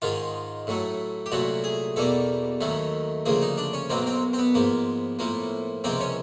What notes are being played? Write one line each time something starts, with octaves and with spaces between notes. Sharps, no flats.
G#2 D#3 G#3 F4
A2 F#3 A3
G4
C2 A#2 F#3 A3 F#4
G#4
E2 B2 G3 A#3 A4
D#2 D#3 F#3 A3
D2 C#3 F3 A#3 G#4
D#4
D4
C#4
B1 B2 F#3 A#3 C4
C4
C4
B3
G#2 F3 A#3
A2 F3 A#3
C#2 C3 F3 A#3 C4
C#4